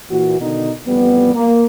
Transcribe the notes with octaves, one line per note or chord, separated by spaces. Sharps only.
A#2 E3 F#4
B2 D3 D#3 D#4
A1 F2 G3 B3
A#3